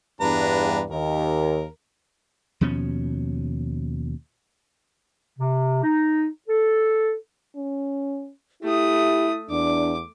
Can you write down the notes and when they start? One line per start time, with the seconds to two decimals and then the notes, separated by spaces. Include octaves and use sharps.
0.21 E2 G2 D4 B4 A#5
0.90 D#2 A#4
2.61 D#2 B2 F3 C#4
5.39 C3
5.83 D#4
6.48 A4
7.56 C#4
8.63 A3 E4 G4 D#6
9.50 E2 D4 D6